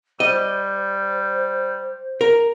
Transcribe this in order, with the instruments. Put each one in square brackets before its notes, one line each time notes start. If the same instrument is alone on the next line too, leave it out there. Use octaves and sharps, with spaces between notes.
[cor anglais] G3 [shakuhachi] C5 [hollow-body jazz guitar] D#5
[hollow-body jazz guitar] A#4